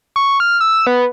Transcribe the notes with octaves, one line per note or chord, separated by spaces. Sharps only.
C#6
F6
E6
B3